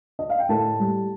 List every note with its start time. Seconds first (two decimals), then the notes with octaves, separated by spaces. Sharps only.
0.19 D#5
0.30 F5
0.39 G5
0.49 A2 A4 A5
0.80 G3